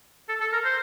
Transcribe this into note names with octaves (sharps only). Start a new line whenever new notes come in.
A4
A4
A#4
C5